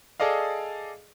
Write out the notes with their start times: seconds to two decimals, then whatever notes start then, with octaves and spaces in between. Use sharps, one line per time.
0.20 G#4 A4 D5 D#5 F5